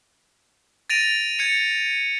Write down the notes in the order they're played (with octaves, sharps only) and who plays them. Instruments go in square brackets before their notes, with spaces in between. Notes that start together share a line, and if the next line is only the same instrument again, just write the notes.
[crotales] A6 A#6 D7 D#7 F7
G#6 C#7 D#7